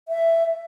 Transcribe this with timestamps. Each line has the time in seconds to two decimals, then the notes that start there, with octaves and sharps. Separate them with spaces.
0.08 E5